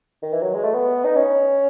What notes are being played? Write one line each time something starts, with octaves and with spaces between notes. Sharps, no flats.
D#3
E3
F#3
G#3
A3
B3
D#4
C#4